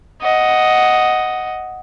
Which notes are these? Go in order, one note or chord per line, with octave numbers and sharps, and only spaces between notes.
D#5 F#5